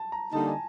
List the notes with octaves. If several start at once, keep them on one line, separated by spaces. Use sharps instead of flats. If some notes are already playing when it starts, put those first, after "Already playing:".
Already playing: A5
A#5
D3 G3 A#3 D#4 A5
G#5